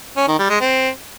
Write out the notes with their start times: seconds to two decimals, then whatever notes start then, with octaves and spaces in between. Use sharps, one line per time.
0.17 C#4
0.28 D#3
0.39 G3
0.50 G#3
0.61 C4